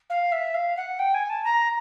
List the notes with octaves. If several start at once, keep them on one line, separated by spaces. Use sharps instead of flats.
F5
E5
F5
F#5
G5
G#5
A5
A#5